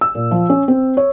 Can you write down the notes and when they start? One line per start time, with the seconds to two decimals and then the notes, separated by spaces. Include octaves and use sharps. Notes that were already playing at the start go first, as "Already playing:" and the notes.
0.01 E6
0.15 A#2
0.31 F3
0.49 C#4
0.68 C4
0.97 C#5